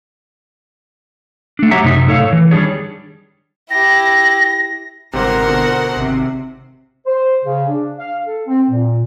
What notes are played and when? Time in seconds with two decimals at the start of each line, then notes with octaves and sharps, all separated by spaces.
1.59 A3 D4
1.71 F#3 G4 C#5 E5 F#5 A#5
1.83 F#2 C3 D#4 E5
2.07 A2 A4 C#5 F5
2.33 E3
2.51 D#3 G3 D4 G#4 C#5
3.71 E4 G4 A#6
5.13 G1 G#2 C3 A#4 C5 F#5
5.47 B2 D3
5.96 G#1 C3
7.06 C5
7.44 C#3
7.68 D4
7.99 F5
8.26 A4
8.47 C4
8.70 A#2